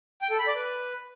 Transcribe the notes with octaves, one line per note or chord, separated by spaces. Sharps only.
G5
A4
B5
D5
B4